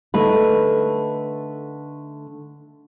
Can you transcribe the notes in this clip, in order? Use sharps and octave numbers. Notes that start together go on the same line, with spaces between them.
D3 A3 D#4 B4